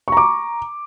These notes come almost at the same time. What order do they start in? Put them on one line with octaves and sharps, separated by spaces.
C#6 A#5 D6